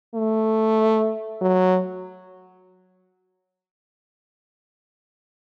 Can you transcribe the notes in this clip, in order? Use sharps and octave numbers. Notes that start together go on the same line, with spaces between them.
A3
F#3